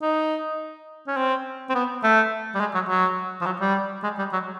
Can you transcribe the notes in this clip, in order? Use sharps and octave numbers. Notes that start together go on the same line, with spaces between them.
D#4
C#4
C4
C4
B3
A3
G3
G#3
F#3
F#3
F3
F#3
G3
G#3
G3
F#3